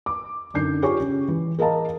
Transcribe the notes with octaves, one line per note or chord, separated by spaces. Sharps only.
D6
F#2 D3 D#4 G6 C7
F4 G4 G#4 C#5 G#5 C#6
C#3
E3
G#4 A#4 D#5 F5 A5 A#5